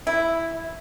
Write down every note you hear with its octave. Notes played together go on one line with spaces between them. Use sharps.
E4